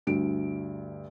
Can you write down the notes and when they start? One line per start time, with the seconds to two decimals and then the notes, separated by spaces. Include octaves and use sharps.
0.07 D2 G2 D7